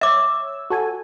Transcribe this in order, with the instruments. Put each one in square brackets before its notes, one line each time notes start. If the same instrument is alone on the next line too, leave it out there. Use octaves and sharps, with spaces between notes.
[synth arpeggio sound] C#5 E6 [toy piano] E5 D6
[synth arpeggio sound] F#4 A4 G#5